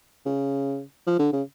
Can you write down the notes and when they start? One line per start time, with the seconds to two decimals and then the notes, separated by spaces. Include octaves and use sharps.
0.26 C#3
1.06 F3
1.19 D3
1.33 C#3